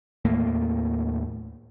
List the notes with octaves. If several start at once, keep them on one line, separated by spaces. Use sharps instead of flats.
D#2 A2 A3 A#3